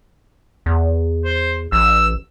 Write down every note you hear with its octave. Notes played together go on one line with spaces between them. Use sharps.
E2
C5
A1 E6